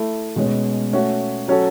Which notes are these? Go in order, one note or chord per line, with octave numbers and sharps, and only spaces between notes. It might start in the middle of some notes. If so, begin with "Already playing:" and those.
Already playing: A3 E4 A4
B2 G#3 C#4
A3 C#4 F#4
F#3 C#4 F#4 A4